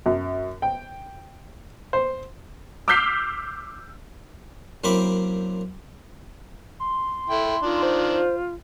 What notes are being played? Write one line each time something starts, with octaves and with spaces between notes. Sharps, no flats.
F#2
G5
C5
D6 E6 F6 G6 B6 C7
F#2 A#3 C4 E4 B5 D6
C6
E4 A4 G5
D#3 D4 F4
C5